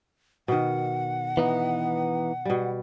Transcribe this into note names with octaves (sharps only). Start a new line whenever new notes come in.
B2 D#3 F#5
E3 B3 D#4
B2 G3